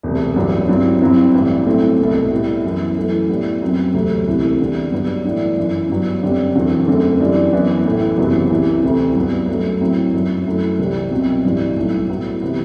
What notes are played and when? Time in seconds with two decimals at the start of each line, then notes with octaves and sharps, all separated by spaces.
0.03 E1 D2 C3
0.36 A1 G2 F#3
0.69 G2 F#3 C4 E4
1.01 G1 G2 F#3 C4 E4
1.34 A1 G2 E3
1.66 A2 F#3 A3 C4 E4
1.99 C2 B2 A3
2.31 A2 G3 B3
2.64 F#2 E3 B3 E4
2.97 F#2 E3 A3 E4
3.29 A2 G3 B3
3.62 F#2 F#3 C4
3.94 E1 D2 C3 F#3 A3
4.27 C2 C3 E3 A3 E4
4.60 E2 D3 G3
4.92 G2 F#3 B3 D4
5.25 A2 E3 B3 D4
5.57 G1 F#2 E3
5.90 G2 F#3 B3
6.23 F#2 D3 G3 C4
6.55 E1 E2 D3 F#3 C4
6.87 F#2 D3 A3 C4
7.20 F#2 E3 G3 D4
7.53 F#2 E3 B3
7.85 A1 A2 E3 A3 E4
8.18 F#1 E2 C3 F#3 B3
8.50 C2 C3 E3
8.83 D2 C3 E3 A3 C4
9.16 G2 F#3 B3
9.48 F#2 F#3 A3
9.80 A2 F#3 C4 E4
10.14 G1 F#2 F#3
10.46 F#2 F#3 A3 E4
10.79 C2 C3 E3 G3 C4
11.11 C2 B2 F#3 C4
11.44 A1 G2 E3 G3
11.76 B1 A2 F#3
12.09 A2 F#3 B3 E4
12.42 C3 E3 B3 E4